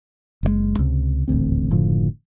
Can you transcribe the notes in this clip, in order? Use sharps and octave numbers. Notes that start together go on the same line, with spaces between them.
F#1 D3 G#3
C#2 C3
D#1 A1 D2 C4
F#1 A2 D3 F3